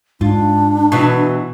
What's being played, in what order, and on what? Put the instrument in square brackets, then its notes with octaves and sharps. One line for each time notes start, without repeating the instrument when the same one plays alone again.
[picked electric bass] G#2 [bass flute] D4 [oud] F4
[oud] B2 E3 F#3